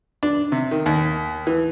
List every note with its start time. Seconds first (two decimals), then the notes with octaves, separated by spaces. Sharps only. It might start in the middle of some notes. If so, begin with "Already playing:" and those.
0.23 D4
0.52 C3
0.71 D#3
0.86 D#2
1.47 E3